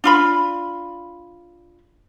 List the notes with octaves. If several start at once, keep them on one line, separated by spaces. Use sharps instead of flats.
D4 F4 B5